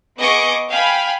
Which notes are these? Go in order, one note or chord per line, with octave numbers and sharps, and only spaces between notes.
B3 G#4 D#5 C#6 D6
F5 G5 G#5 B5